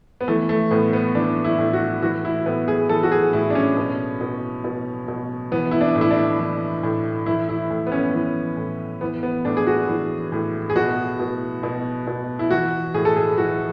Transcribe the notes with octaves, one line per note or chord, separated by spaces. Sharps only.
B3
E3 A3
A3
A2 B3
B3
E3 D4
E4
A2
F#4
E3 F#4
E4
A2 B3
G#4
E3 A4
F#4
G#4
A2 E4
D4
C#4
B2
B2
B2
B2
E3 B3
E4
D4
A2
E4
D4
E3
A2
E3 E4
E4
A2
B3
C#4
E3
A2
E3 B3
B3
A2 D4
G#4
F#4
E3
A2
G#4
B2 F#4
B2
B2
B2
E4
E3 F#4
A2 G#4
A4
G#4
E3 F#4